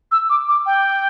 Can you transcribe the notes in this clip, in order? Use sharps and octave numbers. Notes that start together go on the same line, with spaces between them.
E6
D6
D6
G5